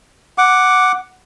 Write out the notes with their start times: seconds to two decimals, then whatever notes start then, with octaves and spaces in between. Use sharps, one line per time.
0.38 F#5 D6